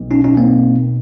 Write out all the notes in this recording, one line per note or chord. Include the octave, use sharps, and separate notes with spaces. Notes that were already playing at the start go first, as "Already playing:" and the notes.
Already playing: B1
C#4 D#4
C#4 D#4
A#3 C4